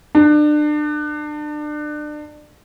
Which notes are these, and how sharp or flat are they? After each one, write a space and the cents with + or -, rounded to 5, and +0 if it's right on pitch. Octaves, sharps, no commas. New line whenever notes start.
D4 +30